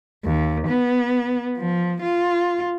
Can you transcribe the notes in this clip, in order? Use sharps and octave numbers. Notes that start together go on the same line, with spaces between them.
D#2
B3
F3
F4